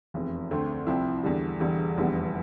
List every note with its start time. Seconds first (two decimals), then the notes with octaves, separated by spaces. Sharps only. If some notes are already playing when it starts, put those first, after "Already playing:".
0.14 F1 E2 C3
0.51 D2 D3 A3 C4
0.87 C2 C3 F3 C4 E4
1.24 E2 D3 G3
1.60 E1 E2 D3 G3
1.97 F1 E2 D3 G3 B3